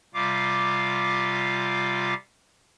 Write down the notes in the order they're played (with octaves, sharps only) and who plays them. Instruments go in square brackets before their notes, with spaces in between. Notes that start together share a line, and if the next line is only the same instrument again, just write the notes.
[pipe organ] C3 G3 F4 F5 D6